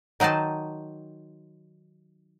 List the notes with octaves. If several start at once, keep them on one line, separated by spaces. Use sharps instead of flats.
D#3 F#3 D#4 C5 A5